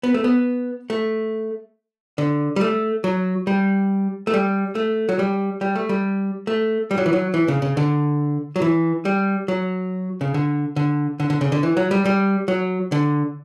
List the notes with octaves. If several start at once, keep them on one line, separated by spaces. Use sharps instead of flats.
B3
A3
B3
A3
D3
G3
A3
F#3
G3
A3
G3
A3
F#3
G3
G3
A3
G3
A3
G3
F#3
E3
F#3
E3
C#3
C#3
D3
F#3
E3
G3
F#3
C#3
D3
D3
D3
D3
C#3
D3
E3
F#3
G3
G3
F#3
D3